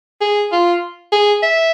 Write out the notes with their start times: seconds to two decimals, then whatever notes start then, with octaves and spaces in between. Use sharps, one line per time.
0.21 G#4
0.52 F4
1.12 G#4
1.43 E5